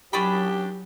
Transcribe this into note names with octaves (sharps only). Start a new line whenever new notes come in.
F#3 C#4 D4 G4 B5